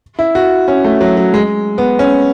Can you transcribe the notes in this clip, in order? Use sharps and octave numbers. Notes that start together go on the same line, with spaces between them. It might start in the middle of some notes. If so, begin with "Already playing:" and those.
E4
F#4
C#4
A3
F#3
F#3
G#3
B3
C#4